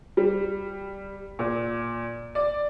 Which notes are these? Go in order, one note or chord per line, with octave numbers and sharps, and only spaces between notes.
G3
A#2
D5